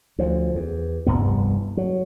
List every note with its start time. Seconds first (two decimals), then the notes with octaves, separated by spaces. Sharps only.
0.19 D2 F3
0.55 E2
1.06 F1 C2 G2 B3
1.77 F#3